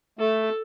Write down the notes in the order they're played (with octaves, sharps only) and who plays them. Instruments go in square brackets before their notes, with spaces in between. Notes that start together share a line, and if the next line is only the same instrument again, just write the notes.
[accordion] A3 [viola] A4